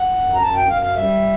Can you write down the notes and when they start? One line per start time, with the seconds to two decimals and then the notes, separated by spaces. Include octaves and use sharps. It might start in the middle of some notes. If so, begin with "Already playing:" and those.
Already playing: F#5
0.15 F#2
0.34 A#5
0.42 F#2 A5
0.56 G5
0.69 F#2 F5
0.82 F5
0.96 G3 E5